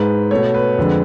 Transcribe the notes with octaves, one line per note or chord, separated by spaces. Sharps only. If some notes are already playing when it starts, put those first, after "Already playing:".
Already playing: G#2 G#3 B4
B2 A3 C#5
B4
F2 D3 G#3